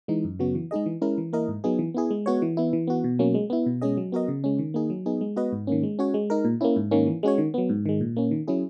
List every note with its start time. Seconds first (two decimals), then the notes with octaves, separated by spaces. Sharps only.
0.08 E3 G#3 D#4
0.24 F#2
0.39 C#3 F#3 B3 F#4
0.55 E3
0.71 G#3 D#4 G#4 D#5
0.86 E3
1.02 G#3 C#4 E4 A#4
1.18 E3
1.33 A#3 E4 A#4 D#5
1.48 G#2
1.64 F#3 B3 D#4 G#4
1.79 E3
1.94 B3 E4 G#4
2.11 G#3
2.26 B3 F#4 C#5
2.42 E3
2.57 B3 E4
2.73 E3
2.87 B3 F#4
3.04 B2
3.19 F#3 A#3 C#4
3.34 G#3
3.50 B3 E4
3.66 B2
3.82 G#3 C#4 G#4 D#5
3.97 F#3
4.12 B3 F#4 A#4 D#5
4.28 C#3
4.44 G#3 C#4
4.59 D#3
4.74 A#3 D#4 G#4
4.90 F#3
5.06 B3 D#4 G#4
5.21 G#3
5.36 B3 F#4 B4 D#5
5.52 G#2
5.67 D#3 A#3 C#4
5.83 G#3
5.99 C#4 F#4 C#5
6.14 G#3
6.30 D#4 A#4
6.45 A#2
6.61 A#3 C#4 E4
6.76 G#2
6.91 D#3 A#3 C#4
7.07 E3
7.23 G#3 C#4 F#4 C#5
7.38 D#3
7.54 F#3 B3
7.69 G#2
7.86 D#3 G#3
8.01 A#2
8.16 A#3 C#4
8.31 D#3
8.48 F#3 C#4 E4 G#4